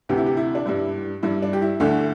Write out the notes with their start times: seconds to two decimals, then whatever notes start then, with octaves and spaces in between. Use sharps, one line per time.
0.09 D2 C3 E3 G4
0.17 E4
0.26 G4
0.37 E4
0.55 D4
0.66 G2 G3 E4
1.23 G2 G3 E4
1.42 D4
1.53 G4
1.62 E4
1.80 D2 D3 A3